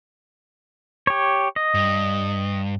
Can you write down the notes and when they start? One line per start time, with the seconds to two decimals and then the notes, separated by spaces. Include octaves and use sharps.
1.07 G4 C#5
1.56 D#5
1.74 G2